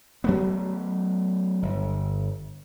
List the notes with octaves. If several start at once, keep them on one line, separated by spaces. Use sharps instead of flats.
F#3 A3 B3
G1